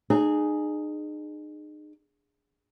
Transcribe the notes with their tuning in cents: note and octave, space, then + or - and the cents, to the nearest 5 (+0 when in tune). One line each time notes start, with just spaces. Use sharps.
D#4 -40 G#4 +0